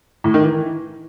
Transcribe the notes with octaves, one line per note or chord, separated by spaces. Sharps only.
A2
D#3
E3